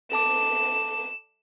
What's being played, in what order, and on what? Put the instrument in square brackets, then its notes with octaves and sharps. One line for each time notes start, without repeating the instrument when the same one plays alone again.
[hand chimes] A4 A5 D6 [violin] E7